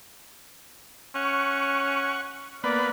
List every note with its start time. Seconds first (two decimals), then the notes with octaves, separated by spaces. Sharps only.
1.15 C#4 F#5 C#6
2.64 A#3 B3 B4 D5